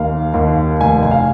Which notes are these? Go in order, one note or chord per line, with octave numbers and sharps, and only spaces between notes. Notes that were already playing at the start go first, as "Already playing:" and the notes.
Already playing: D#2 F5
D#2
F1 G#5
G#5
F5